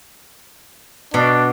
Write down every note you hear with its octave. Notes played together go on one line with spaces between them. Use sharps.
B2 D4